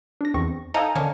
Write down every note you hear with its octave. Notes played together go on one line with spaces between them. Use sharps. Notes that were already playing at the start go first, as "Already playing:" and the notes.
D4 A#6
E2 C4 C#6
D#4 A4 D#5 F5 G#5 A#5
D3 A#3 C#4 D4